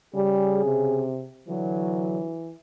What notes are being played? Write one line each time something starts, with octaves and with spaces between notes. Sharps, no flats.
C#3 G3 G#4
C3
D3 E3 F#3